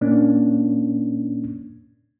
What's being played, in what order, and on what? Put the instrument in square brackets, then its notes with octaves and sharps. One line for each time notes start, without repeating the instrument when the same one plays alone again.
[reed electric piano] A#2 A#3 C#4 D4